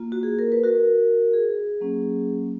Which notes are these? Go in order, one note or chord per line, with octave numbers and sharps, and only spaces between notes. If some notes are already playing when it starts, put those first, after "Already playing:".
Already playing: A#3 F4
F#4
G#4
A#4
B4
F#4 A#4
G#4
F#3 A#3 C#4